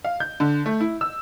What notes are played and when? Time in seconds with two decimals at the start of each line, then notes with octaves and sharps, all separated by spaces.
0.04 F5
0.20 G6
0.40 D3
0.66 A3
0.80 E4
1.01 E6